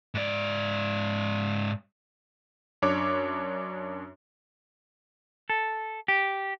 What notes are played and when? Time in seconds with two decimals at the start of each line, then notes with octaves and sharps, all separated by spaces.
0.15 G#2 D5
2.82 F#2 D4 C#5 D6
5.50 A4
6.08 G4